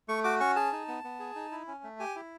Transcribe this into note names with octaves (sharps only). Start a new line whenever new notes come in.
A3 C#6
F#4 D6
C#4 C#6
G#4 A5
D#4
B3
B3
G#4
D#4
E4
C#4
A3
G4 G#5
E4